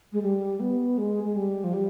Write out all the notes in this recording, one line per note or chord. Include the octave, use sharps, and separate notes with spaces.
G#3
G3
B3
G#3
G#3
G3
F3
G3